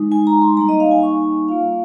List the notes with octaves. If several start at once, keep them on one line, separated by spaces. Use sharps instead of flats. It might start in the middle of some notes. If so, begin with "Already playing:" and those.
Already playing: G#3 D#4
G#5
A#5
C6
G3 A#3 D#4 A#5
D#5
F5
G#5
C#6
A#3 F4 F5